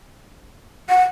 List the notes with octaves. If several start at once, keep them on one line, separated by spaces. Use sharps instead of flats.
F#5